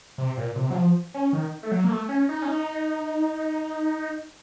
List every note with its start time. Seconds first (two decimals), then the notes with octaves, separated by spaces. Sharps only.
0.18 C3
0.37 A#2
0.56 C3
0.70 F#3
0.75 F3
1.14 C#4
1.33 D#3
1.63 A3
1.72 F#3
1.84 A#3
1.90 A3
2.09 C#4
2.29 D#4
2.42 C#4
2.48 D#4